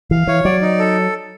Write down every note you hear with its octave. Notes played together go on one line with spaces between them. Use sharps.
E3 F5
E3 C#5
F#3 D5
D#4
A4